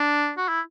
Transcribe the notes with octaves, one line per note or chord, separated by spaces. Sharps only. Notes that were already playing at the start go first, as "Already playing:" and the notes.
Already playing: D4
F#4
E4